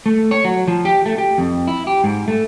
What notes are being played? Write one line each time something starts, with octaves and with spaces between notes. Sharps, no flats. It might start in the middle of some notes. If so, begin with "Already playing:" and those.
A3
C#5
F#3
F3
G4
A3
G4
F2
E4
G4
G#2
A3